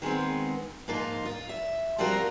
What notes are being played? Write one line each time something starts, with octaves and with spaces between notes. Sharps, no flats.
D#3 G#3 B3 C4
G#2 F3 A#3 D#4 F4
F4
E5
F3 G3 C4 F4 F#4 A#4